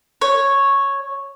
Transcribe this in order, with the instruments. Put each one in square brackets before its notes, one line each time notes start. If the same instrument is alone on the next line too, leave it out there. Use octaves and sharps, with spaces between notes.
[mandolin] C#5